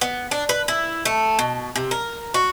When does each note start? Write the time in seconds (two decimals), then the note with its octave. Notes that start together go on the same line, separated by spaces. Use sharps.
0.01 B3
0.31 D4
0.49 B4
0.68 E4
1.05 A3
1.39 B2
1.76 C3
1.91 A#4
2.34 F#4